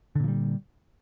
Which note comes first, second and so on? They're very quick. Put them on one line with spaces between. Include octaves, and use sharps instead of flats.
D3 A#2 F3 G3